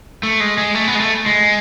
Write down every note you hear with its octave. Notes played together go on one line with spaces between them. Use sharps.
A3
G#3
G#3
A3
B3
G#3
A3
G#3